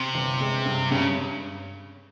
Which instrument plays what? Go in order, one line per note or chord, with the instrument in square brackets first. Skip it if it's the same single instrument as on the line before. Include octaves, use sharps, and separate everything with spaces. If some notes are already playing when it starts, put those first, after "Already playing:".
Already playing: [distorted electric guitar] C3
[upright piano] G1
G#3
G2
[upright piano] G2 [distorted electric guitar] C#3